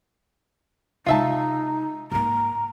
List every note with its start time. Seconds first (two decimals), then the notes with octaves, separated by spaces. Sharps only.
1.06 C3 G#3 D#4 F4 E5 A5
2.12 G#2 A#3 A#5